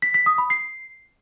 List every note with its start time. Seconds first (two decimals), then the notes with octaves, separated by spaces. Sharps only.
0.02 B6
0.14 B6
0.26 D#6
0.38 B5
0.50 C7